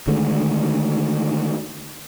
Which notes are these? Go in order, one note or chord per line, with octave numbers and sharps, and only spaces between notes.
D3 D#3 G#3 A3